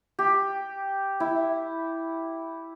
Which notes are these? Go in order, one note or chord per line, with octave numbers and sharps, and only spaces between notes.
G4
E4